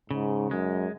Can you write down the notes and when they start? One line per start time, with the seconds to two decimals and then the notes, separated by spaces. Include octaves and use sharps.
0.10 G#2 C#3
0.51 F#2 G#3